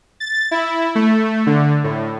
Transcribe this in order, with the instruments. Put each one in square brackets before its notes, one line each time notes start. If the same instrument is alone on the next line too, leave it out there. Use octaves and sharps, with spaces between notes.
[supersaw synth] A6
E4
A3
D3
A2